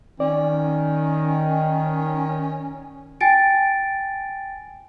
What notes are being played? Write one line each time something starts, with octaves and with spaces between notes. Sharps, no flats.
D#3 C#4 D5
G5 G#5 A6 D7